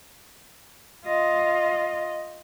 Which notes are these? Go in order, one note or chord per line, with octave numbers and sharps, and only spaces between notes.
F4 D#5